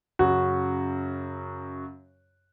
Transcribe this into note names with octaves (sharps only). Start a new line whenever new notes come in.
F#2 C#3 F#4